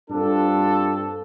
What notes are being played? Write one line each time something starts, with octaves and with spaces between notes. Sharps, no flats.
G2 C4 D4 F4 A4